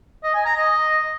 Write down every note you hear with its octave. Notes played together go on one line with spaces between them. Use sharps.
D#5
G#5
A#5
D#5